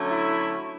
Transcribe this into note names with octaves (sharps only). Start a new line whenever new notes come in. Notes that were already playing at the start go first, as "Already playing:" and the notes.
Already playing: D3 F#3 A3 C#4
E4